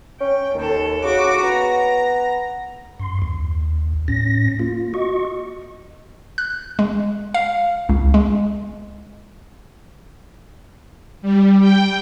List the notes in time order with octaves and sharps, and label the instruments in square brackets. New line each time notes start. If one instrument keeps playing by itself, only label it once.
[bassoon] C#4 [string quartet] G5
[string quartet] D#2 A4 [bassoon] D#3
[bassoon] C#3 [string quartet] F#4 D6
[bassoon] B3 [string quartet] A#5
[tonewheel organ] F#2 C6
D#2
A2 C#4 A#6
A#3 F4
F#4 D#5 C#6
[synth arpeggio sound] F#6
G#3
F5
C#2
G#3
[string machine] G3
G5